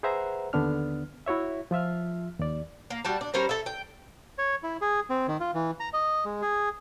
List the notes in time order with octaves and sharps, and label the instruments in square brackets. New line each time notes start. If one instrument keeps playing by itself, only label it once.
[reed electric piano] G#4 B4 C5 E5 F#5 A#5
D#2 D3 B3 D4 F6
E4 F#4 C#5 E5
F3 F4 E5 F6
D#2 D5
[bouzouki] A#3
G3 F#4 A5
D4
G3 C#4 A#4 C5
A4 E5
G5
[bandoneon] C#5
E4
G#4
C4
D#3
F4
E3
A#5
D#5
G#3
G#4